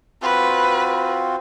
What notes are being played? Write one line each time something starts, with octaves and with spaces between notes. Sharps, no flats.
C4 F4 F#4 B4